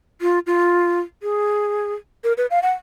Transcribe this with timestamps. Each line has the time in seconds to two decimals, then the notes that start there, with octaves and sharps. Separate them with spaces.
0.21 F4
0.47 F4
1.23 G#4
2.24 A#4
2.38 B4
2.51 F5
2.63 F#5